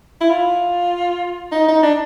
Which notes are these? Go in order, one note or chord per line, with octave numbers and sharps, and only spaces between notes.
E4
F4
D#4
D#4
D4